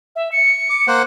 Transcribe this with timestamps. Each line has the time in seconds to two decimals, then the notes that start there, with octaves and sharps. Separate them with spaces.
0.16 E5
0.32 C#7
0.70 D6
0.87 A#3 C5 F#5